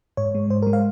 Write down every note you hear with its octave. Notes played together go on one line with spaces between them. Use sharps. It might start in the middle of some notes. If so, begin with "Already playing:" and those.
G#2 C#5
G#3
G#2 C5
A#4
G#3
F5